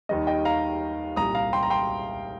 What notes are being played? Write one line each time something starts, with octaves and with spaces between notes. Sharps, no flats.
D#2 D#3 G3 D#5
D#5 G5
F5 A#5
C2 A#2 G3 A#5 D#6
F5 A#5
G5 C6
A#5
G5 C6